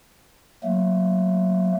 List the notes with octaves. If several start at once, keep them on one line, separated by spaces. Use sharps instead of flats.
F#3 A3 A#3